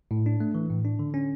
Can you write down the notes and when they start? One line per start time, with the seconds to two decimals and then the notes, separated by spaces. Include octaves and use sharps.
0.11 A2
0.26 D4
0.40 A3
0.55 E3
0.70 A2
0.85 D4
0.99 D3
1.14 C#4